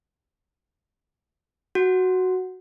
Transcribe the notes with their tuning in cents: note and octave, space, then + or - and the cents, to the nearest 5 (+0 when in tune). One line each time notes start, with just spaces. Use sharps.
F#4 +0 F#5 +0